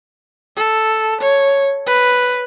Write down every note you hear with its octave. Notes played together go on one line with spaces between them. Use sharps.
A4
C#5
B4